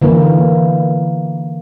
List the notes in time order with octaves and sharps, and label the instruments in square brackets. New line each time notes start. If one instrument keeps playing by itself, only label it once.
[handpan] D3 E3 A#3